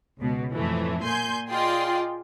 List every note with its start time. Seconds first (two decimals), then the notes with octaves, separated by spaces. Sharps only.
0.19 C#2 B2
0.53 F2 A2 E3 A3
1.02 A#2 G#5 C6 G6
1.49 F4 G#4 D5 D#5 G5 C6